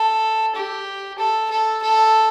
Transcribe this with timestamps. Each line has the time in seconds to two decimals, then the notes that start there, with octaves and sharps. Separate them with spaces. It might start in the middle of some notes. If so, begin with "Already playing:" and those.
Already playing: A4
0.55 G4
1.18 A4
1.50 A4
1.82 A4